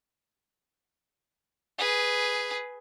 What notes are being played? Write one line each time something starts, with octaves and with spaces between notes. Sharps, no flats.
G#4 B4